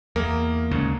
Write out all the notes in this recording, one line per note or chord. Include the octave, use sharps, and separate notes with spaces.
E2 A#3
D2 G#2 C#3